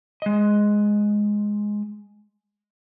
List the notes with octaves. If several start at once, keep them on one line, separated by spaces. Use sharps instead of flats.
G#3 D#5